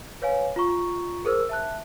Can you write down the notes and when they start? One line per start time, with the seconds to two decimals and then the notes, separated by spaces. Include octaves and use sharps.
0.22 B4 C#5 F5 G#5
0.56 F4 A#5 C#6
1.25 G#4 A#4 C5 E6
1.49 E5 A5 F#6